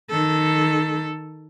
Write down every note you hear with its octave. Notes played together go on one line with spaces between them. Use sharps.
D#3 A4